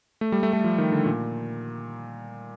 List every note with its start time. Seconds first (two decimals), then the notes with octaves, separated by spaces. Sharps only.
0.21 A3
0.32 G3
0.43 A3
0.53 A3
0.64 F3
0.78 D#3
0.92 D3
1.06 A#2